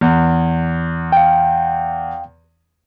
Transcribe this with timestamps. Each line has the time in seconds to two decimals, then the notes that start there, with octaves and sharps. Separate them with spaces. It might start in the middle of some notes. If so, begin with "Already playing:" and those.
0.01 E2
1.12 F5 G5